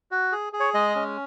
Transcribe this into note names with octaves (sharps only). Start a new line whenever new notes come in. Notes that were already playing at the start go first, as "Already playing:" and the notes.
F#4
G#4
G#4
C#5
G#3 D#5
C#4